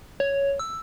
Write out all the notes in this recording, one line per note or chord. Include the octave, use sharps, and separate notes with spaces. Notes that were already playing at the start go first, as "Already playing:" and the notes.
C#5
E6